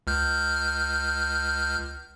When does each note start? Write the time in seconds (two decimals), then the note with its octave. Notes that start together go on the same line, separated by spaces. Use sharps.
0.07 C#2 F6 G6